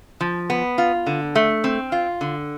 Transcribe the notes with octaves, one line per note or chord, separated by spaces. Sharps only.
F3
B3
F4
D3
A3
C4
F4
D3